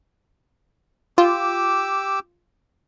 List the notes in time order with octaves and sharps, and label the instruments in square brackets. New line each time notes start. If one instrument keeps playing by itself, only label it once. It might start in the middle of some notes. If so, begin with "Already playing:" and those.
[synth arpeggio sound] F4 [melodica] G4 D6 E6